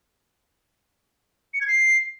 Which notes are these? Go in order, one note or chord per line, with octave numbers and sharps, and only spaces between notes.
C#7
G#6
C7